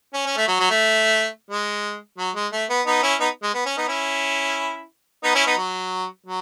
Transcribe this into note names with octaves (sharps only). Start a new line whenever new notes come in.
C#4
C#4
A3
F#3
F#3
A3
G#3
F#3
G#3
A3
B3
B3 D#4
C#4 E4
B3 D#4
G#3
B3
C#4
B3 D#4
C#4 E4
B3 D#4
C#4 E4
B3 D#4
F#3
F#3